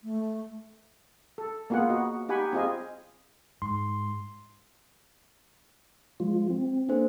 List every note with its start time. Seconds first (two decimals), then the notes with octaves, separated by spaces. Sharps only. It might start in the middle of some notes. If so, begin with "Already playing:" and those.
0.03 A3
1.38 A4
1.70 A#3 B3 F4 G#4 F#5
1.89 F#4 D#5
2.29 D#4 G4 F#5 G#5 B5
2.53 C4 F4 G#4 D#5 G#5
3.62 G#2 C6
6.20 F3 G#3 F4
6.50 C4
6.89 A#3 D4 A4 C5